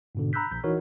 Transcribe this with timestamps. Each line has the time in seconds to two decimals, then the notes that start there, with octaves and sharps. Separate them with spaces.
0.15 G#2 B2 D3
0.33 A#5 B5 E6 F#6 G6 B6
0.51 A#1 G6
0.64 E3 D#4 E4 F#4 A#4 C#5